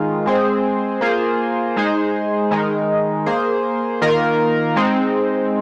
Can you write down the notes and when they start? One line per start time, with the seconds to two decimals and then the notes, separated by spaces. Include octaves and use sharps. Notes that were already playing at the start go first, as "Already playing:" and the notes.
Already playing: D#3 G#3 F4
0.26 G#3 C4 G#4 C5
1.01 A#3 F4 G#4 C5
1.76 G#3 D#4 G#4 C5
2.51 D#3 G#3 D#4 A#4
3.26 A#3 G#4 C5
4.02 D#3 A#3 F4 A#4
4.76 G#3 C4 D#4